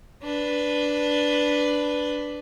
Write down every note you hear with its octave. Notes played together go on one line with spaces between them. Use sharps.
D4 B4